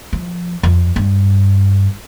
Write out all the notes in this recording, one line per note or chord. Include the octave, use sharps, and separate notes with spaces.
F3
F2
G2